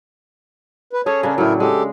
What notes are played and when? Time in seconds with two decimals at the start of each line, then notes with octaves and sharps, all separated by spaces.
0.93 B4
1.06 C#4 G#4 A4 C#5
1.23 C#3 A#3 C#4 D4
1.38 A2 F#3 E4 A#4
1.60 G#3 G4 A4